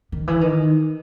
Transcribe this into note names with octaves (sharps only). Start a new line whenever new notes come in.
D#3
E3
D#3